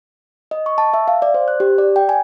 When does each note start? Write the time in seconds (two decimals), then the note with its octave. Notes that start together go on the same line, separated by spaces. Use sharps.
0.51 D#5
0.66 C#6
0.78 A5
0.94 E5
1.08 F5
1.22 D5
1.34 C5
1.48 F#6
1.60 G4
1.78 D5
1.96 G5
2.09 G#5